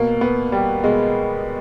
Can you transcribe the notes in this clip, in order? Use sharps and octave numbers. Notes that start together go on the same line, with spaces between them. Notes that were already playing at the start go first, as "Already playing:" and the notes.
Already playing: B2 A#3
B3
G3
B2 G#3